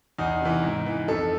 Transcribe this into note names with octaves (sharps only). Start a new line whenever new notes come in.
E2 D#4
C3 E3
G#2
E3
F2 A4